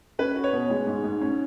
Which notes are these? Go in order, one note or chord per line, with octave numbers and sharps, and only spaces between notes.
C#4 B4
F#4
C#5
B2
G#3
G#2
G#2
C#4